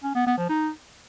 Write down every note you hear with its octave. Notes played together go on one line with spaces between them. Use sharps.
C#4
B3
B3
F3
D#4